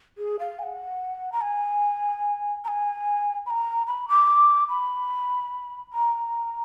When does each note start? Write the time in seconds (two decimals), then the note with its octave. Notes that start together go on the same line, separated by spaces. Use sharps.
0.18 G#4
0.39 F5
0.59 G#5
0.63 F#5
1.32 A#5
1.41 G#5
2.64 A#5
2.68 G#5
3.46 B5
3.50 A#5
3.87 B5
4.09 D6
4.69 B5
5.93 A#5